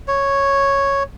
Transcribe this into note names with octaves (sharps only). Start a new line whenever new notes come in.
C#5